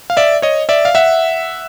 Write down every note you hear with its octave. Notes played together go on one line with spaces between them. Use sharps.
F5
D5 E5
C#5 D#5
D5 E5
F5
E5 F#5